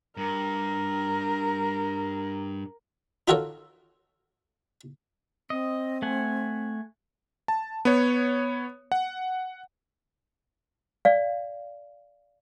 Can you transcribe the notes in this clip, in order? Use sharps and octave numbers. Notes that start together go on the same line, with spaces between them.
G2 A#4
D#4 F4 F#4 A4 A#4 C#5
C4 D#5
A3 F#5 G#5
A5
B3 C#5
F#5
D5 F5